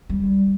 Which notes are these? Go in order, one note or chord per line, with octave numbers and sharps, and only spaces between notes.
G3